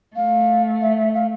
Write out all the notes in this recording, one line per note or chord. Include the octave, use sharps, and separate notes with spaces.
A3 F5
E5
E5
F5